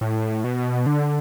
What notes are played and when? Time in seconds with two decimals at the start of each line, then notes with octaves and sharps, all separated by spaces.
0.01 A2
0.44 B2
0.86 D3